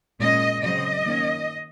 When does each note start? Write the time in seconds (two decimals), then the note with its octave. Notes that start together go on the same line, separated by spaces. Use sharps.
0.19 A#2 G#3 C#4 D#5
0.61 C#3 F#3 C4 D#5
1.03 D#3 A#3 C#4